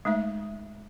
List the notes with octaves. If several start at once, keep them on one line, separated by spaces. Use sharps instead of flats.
G#3 A3 D#4 E5